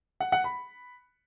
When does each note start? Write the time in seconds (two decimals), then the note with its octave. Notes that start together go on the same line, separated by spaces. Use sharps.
0.20 F#5
0.32 F#5
0.44 B5